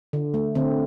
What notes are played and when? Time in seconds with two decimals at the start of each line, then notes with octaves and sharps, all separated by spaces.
0.13 D3
0.34 A3
0.55 D3 C4